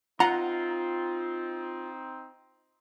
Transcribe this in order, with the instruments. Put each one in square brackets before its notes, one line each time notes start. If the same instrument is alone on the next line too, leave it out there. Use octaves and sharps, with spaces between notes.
[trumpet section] C4 D#4 [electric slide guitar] F4 [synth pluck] F#5 [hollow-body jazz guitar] A#5